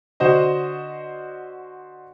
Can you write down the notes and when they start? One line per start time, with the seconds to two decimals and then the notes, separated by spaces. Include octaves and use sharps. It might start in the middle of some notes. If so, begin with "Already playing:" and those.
0.20 D3 F#4 C5 D#5